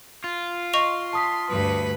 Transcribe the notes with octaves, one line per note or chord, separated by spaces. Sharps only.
F4
D#5 C6 C#6 F7
A5 D#6 B6
D2 G2 B4